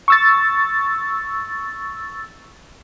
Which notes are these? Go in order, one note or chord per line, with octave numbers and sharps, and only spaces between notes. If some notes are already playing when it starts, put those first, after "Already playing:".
C#6 E6 A6